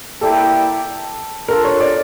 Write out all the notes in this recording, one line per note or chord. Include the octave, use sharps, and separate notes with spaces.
A#3 E4 G4 A4 D5 G5
D4 F4 A4 A#4
C#5
D5